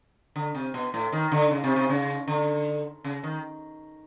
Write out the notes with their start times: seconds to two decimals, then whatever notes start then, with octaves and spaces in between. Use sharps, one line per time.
0.36 D3
0.55 C3
0.74 B2
0.94 A2
1.12 D#3
1.32 D3
1.51 C#3
1.64 C3
1.76 C3
1.90 C#3
2.28 D3
3.04 C#3
3.23 D#3